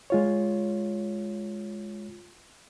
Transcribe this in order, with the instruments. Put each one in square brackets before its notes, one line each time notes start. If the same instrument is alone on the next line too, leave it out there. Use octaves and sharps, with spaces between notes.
[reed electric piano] G#3 F4 C#5